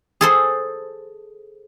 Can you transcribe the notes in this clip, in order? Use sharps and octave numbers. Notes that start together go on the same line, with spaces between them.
G#4 A4 C5